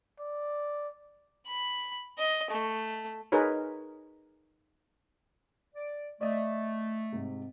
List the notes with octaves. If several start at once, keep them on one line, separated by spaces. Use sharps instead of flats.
D5
B5
D#5
A3
D#4 G#4 A#4 B4 C#5
D5
A3 D5 D#5
G#2 C3